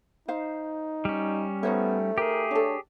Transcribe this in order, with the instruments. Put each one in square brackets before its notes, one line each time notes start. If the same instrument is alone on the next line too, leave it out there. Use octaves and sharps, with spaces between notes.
[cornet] D#4 [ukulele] C5 F5
[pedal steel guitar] G3 C#4
[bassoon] A3 [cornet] B3 [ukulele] D#4 C5 C#5
[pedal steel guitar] G4 G#4 [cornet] A#4
[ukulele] D4 A4 [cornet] C#5